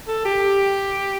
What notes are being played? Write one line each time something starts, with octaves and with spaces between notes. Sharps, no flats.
A4
G4